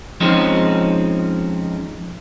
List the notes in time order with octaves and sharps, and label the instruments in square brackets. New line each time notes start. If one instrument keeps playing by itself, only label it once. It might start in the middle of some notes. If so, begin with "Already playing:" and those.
[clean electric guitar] F3 G#3 C4 C#4 D#4